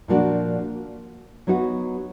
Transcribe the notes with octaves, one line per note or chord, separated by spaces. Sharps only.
A#2 F3 A#3 D4 F#4
F#3 B3 D#4 F#4